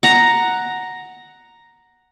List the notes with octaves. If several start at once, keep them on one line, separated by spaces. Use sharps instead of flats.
F#5 A#5